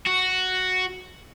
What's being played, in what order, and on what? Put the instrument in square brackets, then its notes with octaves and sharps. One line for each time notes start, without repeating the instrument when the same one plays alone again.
[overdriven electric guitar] F#4